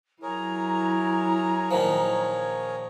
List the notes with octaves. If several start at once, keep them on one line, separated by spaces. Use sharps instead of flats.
F#3 E4 G#4 A#4 C#5 A#5
A#2 D#3 F3